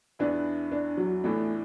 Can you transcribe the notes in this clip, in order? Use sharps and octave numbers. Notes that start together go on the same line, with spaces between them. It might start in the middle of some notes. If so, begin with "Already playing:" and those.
E2 E3 B3 D4 E4 B4
D4
F#3
A2 E3 A3 B3 D4